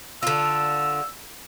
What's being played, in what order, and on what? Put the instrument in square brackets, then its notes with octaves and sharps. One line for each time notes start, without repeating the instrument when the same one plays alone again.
[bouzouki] D3 F4 [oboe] E6